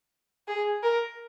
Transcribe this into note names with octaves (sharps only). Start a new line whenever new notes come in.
G#4
A#4